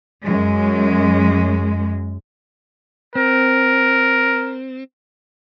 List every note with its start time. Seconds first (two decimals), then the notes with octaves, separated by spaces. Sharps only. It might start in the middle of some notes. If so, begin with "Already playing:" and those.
0.22 F#2 G#3
3.15 C4 A#4